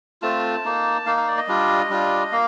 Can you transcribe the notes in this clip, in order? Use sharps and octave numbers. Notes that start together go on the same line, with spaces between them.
A3 C4 F4 A5
A#3 D#4
A#3 D#4 F5
F5
D5
D#5
G3 D4 F4
G3 D4 F4
A#3 F5